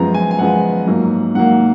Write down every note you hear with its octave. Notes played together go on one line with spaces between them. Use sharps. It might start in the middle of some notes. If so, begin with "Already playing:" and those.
Already playing: F#2 F3 G#3 B3 A#5
G#5
G#5
F#2 F3 G#3 B3 F#5
G#2 F#3 A#3
G#2 F#3 A#3 F#5